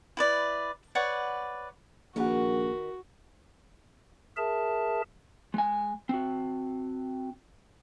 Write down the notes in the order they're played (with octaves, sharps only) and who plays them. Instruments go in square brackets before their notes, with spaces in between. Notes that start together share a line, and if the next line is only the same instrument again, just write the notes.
[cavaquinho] E4 B4 D5
B4 C#5 D5 F#5
[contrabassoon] A#1 [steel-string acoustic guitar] D#3 A#4 B4 [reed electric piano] A#3 G#4 F#5 [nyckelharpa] F#4
[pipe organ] G#4 A#4 E5 A5
[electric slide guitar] G#3 G#5
C4 F#4